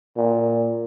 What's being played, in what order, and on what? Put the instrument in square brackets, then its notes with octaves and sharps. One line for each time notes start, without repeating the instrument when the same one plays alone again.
[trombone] A#2